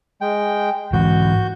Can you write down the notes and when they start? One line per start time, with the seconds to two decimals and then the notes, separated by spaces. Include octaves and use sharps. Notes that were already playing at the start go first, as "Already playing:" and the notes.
0.21 G#3 G5
0.93 G#2 E3 F#4 G6